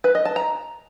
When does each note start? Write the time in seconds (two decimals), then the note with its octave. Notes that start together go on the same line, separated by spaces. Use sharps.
0.04 B4
0.15 D#5
0.25 A5
0.36 A#5